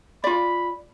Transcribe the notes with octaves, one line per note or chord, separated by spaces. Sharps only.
F4 D5 B5